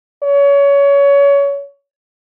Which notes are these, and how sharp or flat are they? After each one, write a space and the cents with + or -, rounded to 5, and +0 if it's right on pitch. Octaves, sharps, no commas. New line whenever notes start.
C#5 +25